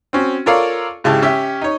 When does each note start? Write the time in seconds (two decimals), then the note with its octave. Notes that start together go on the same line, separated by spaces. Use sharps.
0.13 C4 C#4 F#4
0.46 F4 A4 A#4 C#5 D5 F5
1.04 G#1 C#3 E4 G4 A5
1.22 C#4 G4 E5
1.62 D#4 C#5